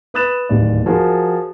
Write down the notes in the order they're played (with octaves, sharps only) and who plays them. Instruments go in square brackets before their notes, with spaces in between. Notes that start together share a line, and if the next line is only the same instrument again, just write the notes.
[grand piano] B4 B5 D#6 F#6 A6 E7
D1 D#2 D5
F3 F#4 G#4 A#4